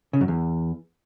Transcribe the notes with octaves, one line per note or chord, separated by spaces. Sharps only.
C#3
F#2
E2